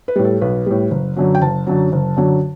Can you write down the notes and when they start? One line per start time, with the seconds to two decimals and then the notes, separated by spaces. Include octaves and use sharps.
0.08 B4
0.16 A2 G3
0.25 A4
0.41 B1 B4
0.66 A2 G3
0.91 F#1
1.17 F#2 D3 F#3
1.35 G5
1.41 F#1 A5
1.67 F#2 D3 F#3
1.92 F#1
2.17 F#2 D3 F#3